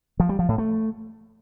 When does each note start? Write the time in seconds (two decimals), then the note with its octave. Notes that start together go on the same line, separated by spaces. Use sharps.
0.20 F3
0.29 G3
0.39 F3
0.49 A2
0.58 A3